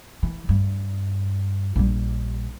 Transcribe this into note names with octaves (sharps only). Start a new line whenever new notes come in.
E3
G2
A#1 G3